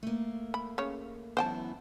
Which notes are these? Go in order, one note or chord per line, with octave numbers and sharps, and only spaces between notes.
A3 A#3
B5
C#3 C#5
F#2 E3 B3 C5 G5 A5